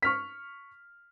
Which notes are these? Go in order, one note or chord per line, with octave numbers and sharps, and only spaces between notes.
C#6 F6 B6